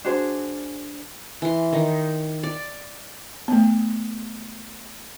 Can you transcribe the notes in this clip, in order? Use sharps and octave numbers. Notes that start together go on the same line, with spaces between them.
D4 F#4 G#4 C5
E3 C6
D#3 D#4
D5
A3 B3